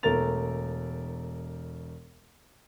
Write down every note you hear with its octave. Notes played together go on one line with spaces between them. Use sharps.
E1 A3 A#4 A#5 A6 F7